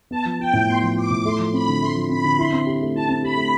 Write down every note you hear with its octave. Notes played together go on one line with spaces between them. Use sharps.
B3 A5
F3
F4 G5
A2
B3 C6
F3
F4 D6
A2
A3 C6
F3
C4 B5
D3
A3 C6
F3
C4 B5
D3
E4 C6
C4
G4
A3
E4 A5
C4
G4 B5
A3